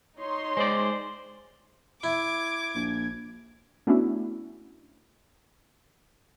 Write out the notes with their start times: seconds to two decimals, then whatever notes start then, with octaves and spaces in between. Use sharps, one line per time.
0.18 D#4 C#5 C6
0.57 G#3 C5 D5
2.03 E4 D6 G#6
2.75 A#1
3.87 A3 B3 C#4 D4 E4 F#4